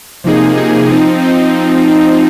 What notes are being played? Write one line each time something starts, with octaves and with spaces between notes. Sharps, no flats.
C3 F3 A#3 D#4 G#4
C3 F3 A#3 D#4 G#4
F3 C4 D#4
F3 C4 D#4